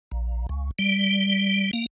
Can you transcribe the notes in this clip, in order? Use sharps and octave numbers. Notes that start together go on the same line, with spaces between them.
A#1
C#2
G3
A#3